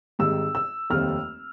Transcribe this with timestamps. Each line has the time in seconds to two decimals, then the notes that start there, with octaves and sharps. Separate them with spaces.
0.19 G#1 G#2 D#3 G3 E6
0.55 E6
0.90 F1 D#2 D#3 G3 C4 F6